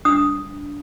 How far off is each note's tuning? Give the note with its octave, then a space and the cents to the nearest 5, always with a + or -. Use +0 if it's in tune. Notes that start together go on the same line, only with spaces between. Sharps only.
D4 -15 D#6 +0